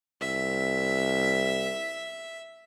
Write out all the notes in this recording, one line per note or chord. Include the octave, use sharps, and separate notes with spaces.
C2 E5